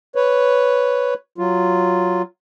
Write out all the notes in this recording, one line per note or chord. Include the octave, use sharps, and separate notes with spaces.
B4 C#5
F#3 F4